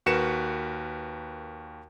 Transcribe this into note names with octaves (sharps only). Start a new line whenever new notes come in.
D#2 F#4 A#4 B4 C#7 E7